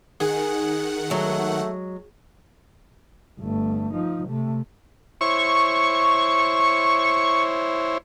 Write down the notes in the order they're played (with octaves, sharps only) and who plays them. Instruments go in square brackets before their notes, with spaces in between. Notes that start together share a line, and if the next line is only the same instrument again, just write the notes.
[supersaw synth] D#3 F#5 [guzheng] G#4
[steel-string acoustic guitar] F#3 G#3 [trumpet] A3
[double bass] G1 A3
F3 D#4
C3 A3
[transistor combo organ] E4 C5 C#5 [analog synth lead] C#6